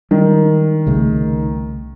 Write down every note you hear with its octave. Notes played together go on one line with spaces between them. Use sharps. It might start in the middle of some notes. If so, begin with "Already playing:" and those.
D#3 G3 G#3
C2 C#3 A3